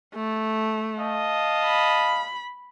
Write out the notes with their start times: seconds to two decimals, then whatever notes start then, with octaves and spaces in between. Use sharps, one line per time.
0.15 A3
0.98 D#5 F5 A5
1.65 B5